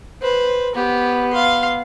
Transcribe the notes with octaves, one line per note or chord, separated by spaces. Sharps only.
B4 C5
B3 G4
F5 C6